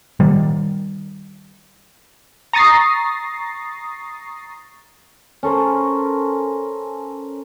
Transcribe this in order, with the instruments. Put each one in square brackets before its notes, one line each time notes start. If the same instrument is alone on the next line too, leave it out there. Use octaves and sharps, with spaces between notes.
[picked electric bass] D#3 G3
[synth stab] A#5 C#6 D#6 A6 A#6 C7
[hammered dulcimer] C#4 A4 A#4 C5